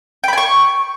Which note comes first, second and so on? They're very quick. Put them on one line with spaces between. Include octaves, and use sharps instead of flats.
G5 B5 G#5 C#6